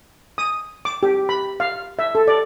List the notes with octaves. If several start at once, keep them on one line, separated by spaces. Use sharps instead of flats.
D#6
D6
G4
B5
F5
E5
A4
D5